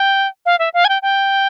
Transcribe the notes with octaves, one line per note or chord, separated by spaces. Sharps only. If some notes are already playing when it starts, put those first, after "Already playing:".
Already playing: G5
F5
E5
F5
G#5
G5
G5